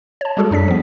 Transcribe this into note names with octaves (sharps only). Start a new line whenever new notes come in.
C#5 A5
G3 G#3 F#4 G#4 A4
F#2 D4 D5 B6
F3 B3